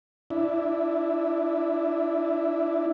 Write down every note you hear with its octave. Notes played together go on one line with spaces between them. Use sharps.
D4 E4